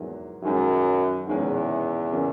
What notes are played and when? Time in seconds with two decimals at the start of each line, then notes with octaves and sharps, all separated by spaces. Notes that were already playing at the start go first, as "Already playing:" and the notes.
Already playing: E2 G#2 F#3 A#3
0.43 F#2 D#3 G#3 C#4
1.27 E2 D#3 G#3 C#4
2.12 C#3 E3 A#3 C#4